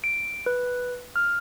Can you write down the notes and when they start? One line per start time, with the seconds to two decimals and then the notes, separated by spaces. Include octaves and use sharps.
0.04 D7
0.46 B4
1.16 F6